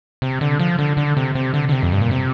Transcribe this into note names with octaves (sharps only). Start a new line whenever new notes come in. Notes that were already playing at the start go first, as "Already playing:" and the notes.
C3
D3
F3
D3
D3
C3
C3
D3
D3
C3
F2
G2
A#2
C3